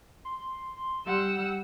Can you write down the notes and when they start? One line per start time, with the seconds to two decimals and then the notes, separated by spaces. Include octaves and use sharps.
0.25 C6
1.07 G3 F#5 E6